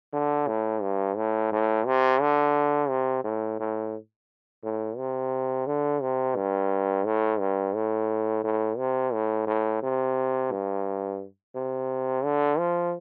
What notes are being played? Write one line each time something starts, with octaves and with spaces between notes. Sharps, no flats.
D3
A2
G2
A2
A2
C3
D3
C3
A2
A2
A2
C3
D3
C3
G2
A2
G2
A2
A2
C3
A2
A2
C3
G2
C3
D3
F3